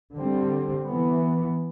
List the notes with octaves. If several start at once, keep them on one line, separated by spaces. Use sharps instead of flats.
D3 G3 C4
E3 B3